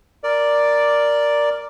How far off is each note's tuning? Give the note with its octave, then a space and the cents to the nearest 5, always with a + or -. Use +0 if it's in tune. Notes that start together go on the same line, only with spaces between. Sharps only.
A#4 +0 D5 +0 D6 -5